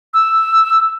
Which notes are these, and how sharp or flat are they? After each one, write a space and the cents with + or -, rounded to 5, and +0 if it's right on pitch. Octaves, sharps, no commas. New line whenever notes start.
E6 +0